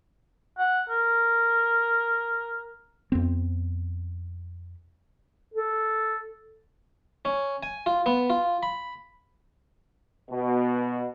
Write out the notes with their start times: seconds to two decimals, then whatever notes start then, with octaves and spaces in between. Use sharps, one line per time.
0.59 F#5
0.90 A#4
3.12 F2 B3 C4
5.54 A4
7.25 C#4
7.63 G#5
7.86 F4
8.06 B3
8.30 F4
8.63 B5
10.31 B2